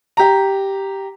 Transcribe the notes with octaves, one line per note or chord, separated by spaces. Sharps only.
G4 A#5